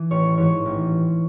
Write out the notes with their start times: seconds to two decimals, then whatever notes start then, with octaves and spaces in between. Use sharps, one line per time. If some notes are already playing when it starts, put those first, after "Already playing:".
Already playing: E3
0.11 A1 C#5
0.38 G#2 E3 C#5
0.66 A1